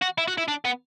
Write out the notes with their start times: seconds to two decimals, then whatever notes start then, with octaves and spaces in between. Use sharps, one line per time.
0.02 F#4
0.18 E4
0.28 F#4
0.38 E4
0.48 D4
0.65 B3